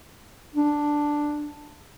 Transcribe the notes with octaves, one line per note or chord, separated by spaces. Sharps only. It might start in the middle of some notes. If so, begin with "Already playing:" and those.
D4